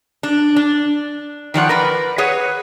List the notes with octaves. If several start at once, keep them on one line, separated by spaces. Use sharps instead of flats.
D4
D4
D#3 F3 D5 F#5
A#4 B4 D5
G#4 B4 C#5 F#5